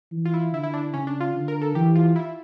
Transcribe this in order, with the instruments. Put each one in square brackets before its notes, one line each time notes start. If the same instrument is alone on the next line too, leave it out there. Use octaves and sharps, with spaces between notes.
[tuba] E3
[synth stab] F4
E4
[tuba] D3 [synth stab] E4
[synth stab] E4
D4
[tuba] C#3 [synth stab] C#4
[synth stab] D4
F4
[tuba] D3
[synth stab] A#4
A4
[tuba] E3 [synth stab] G4
[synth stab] F4
E4